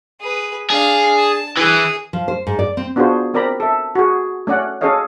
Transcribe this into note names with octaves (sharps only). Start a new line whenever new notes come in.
G#4 B4
D4 G#4 F5
A5
E3 G#4
F3
C5
G#2
D5
C4
B3 D4 F4 F#4 G#4 C5
C4 A#4 D5 A#5 B5
A4 E5
F#4 G#4
A3 C#4 D5 F#5
C#4 G#4 A4 C#5 D#5 F5